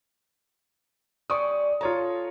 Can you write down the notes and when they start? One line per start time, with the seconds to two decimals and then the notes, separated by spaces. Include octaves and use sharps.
1.30 G3 C#4 D5 C#6 D#6
1.81 F4 A4 C#5 A#5